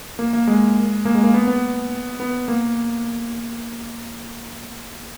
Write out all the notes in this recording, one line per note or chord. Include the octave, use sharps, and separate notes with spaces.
A#3
A#3
G#3
A#3
G#3
A#3
B3
B3
B3
A#3